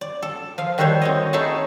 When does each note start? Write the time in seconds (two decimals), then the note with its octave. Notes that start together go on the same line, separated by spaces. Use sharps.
0.01 D5
0.22 A4
0.58 F3 F5
0.78 D#3 G3 F#4 A4 C5 C#5
1.02 C4 C#5 D#5
1.33 A3 D#4 E4 G#4 C#5 A5